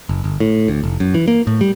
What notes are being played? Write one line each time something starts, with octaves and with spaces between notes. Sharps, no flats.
F#1
G1
A2
D2
F1
F#2
E3
A#3
A2
G3